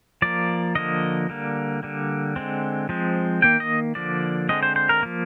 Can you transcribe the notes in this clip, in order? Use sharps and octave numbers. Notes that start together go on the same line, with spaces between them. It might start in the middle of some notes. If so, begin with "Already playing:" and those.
F3 A#3 D5
D3 F3 A#3 D#5
D3 G3 A#3
D3 G3 A#3
D3 G#3 C4
F3 G#3 C4
D#3 A#3 G5
D#5
D3 F3 A#3 D5
D3 G#3 C4 D#5
C5
C5
A#4
F3 A#3